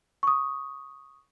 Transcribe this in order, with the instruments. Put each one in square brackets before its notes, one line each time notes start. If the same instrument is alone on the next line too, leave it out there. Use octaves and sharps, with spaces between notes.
[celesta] C#6 D#6